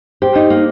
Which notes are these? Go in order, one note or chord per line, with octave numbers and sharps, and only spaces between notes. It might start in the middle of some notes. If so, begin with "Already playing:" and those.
G4 C5
D#4
A#3